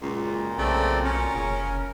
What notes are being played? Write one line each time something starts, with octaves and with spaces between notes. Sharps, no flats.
C#2 F#2 A#2
B1 C#3 A3 C4 D5
C#4 A#4
F1 C#3